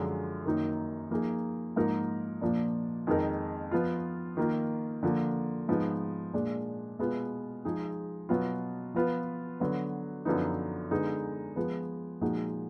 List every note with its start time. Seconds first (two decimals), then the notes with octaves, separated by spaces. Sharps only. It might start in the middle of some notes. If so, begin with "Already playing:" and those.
Already playing: F#2 D3 F3 G#3 D4
0.45 F#2 D#3 A#3 D#4
1.11 F3 A#3 D#4 G#4
1.76 G#2 F3 A#3 D#4 A#4
2.41 A#2 F3 A#3 D4
3.07 F2 D#3 G#3 D#4 A#4
3.71 F3 B3 F4
4.37 D#3 A#3 F4
5.03 D3 F3 A#3
5.68 G#2 F3 B3 D#4 G#4
6.33 A#2 G#3 D4
6.99 B2 G#3 B3 F4
7.65 F3 G#3 D#4 G#4
8.29 B2 F#3 B3 F4
8.94 F3 B3 F4 B4
9.60 D3 F#3 B3
10.25 F#2 D3 F3 B3 D#4
10.91 D3 G#3 B3 D#4
11.56 F3 G#3 B3
12.21 A#2 F3 G#3 D#4 F#4